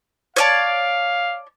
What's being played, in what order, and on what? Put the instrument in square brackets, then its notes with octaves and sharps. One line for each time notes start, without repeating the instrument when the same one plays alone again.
[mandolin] C#5 D5 A5 [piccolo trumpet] F5